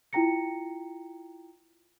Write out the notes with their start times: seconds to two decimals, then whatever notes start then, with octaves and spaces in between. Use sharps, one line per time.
0.13 E4 F4 G5 A#5 A#6 C#7